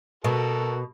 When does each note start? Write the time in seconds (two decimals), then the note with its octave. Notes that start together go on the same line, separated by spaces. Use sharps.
0.24 B2 F#4 A4 A#4